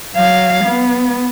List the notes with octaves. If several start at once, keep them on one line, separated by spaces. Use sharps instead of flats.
F#3 F5
B3